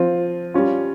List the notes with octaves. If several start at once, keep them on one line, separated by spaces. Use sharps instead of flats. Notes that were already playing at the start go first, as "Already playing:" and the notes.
Already playing: F3 C4 F4
G3 C#4 F4